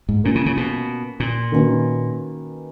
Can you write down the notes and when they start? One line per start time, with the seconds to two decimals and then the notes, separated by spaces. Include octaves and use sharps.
0.09 G#2
0.24 A#2 A#3 C#4 F4
0.35 C#3
0.46 C#3
0.57 B2
1.20 A#2
1.52 D#3 A#3 C#4 F#4 B4